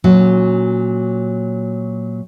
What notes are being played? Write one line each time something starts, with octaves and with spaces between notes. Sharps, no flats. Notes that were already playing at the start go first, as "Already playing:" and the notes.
A#2 F#3 C#4 F#4